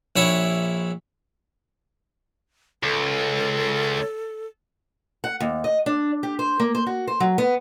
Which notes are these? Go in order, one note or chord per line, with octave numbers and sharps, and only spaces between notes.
A#1 E4 C#5
C#2 A4
F#5
D#2
D#5
D4
G4
C5
A#3
C5
F#4
C5
F#3
B3